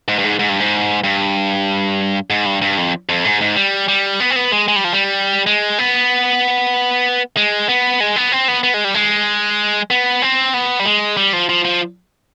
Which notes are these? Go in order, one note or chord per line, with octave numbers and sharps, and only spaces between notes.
G#2
G2
G#2
G#2
G2
G#2
G2
G#2
G2
G2
F2
F2
G#2
G#2
G3
G3
B3
C4
B3
G#3
G#3
G3
F3
G3
G#3
B3
G#3
B3
G#3
B3
C4
B3
B3
G#3
G3
G#3
B3
C4
B3
G3
G#3
G3
F3
F3
F3